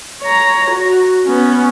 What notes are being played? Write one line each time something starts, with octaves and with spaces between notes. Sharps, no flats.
C#5 A#5
F#4
B3 C#4